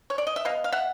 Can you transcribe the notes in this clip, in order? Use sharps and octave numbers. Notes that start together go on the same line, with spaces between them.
C#5
D5
D#5
E5
B2 D#5 F5
F5
E5 F#5